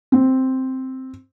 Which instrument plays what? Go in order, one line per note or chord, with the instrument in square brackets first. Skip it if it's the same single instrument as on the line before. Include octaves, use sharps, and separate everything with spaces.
[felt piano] C4